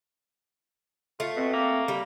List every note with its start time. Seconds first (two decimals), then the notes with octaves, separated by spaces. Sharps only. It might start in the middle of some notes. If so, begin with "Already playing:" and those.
1.20 A3 F4
1.36 B2 C4
1.53 A#3
1.88 G3